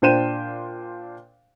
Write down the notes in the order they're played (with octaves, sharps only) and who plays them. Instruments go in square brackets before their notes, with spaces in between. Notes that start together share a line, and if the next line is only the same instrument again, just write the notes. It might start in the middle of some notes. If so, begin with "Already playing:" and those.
[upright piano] A#2 D4 C5 G5 D#7 E7